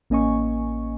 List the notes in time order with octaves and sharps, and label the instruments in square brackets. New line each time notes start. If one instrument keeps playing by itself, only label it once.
[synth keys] A1 A#3 C#4 D#5 G#5 C#6